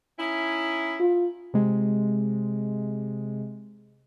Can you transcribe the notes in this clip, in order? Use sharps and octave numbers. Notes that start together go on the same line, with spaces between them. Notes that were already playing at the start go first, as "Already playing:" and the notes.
C#4 D#4 E4
F4
C3 G#3